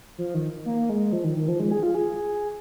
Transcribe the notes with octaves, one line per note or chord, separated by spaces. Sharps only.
F3
D#3
A#3
G#3
F3
D#3
D#3
F3
G#3
G#4
F4
G#4